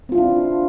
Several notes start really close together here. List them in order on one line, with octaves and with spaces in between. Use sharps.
C4 F4 E4 D4